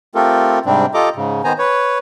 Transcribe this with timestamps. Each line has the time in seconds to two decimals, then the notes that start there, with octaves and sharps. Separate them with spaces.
0.15 A3 C4 F4 G4 A4 A#4
0.66 G#2 C3 G3 C4 D4
0.94 F4 G4 A4 D#5 A#5 D6
1.16 G#2 C#3
1.44 D#3 B3 C5 G#5 A#5
1.58 B4 C#5